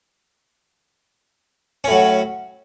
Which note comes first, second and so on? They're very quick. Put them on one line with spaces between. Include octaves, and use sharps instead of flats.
C#4 A2 F#3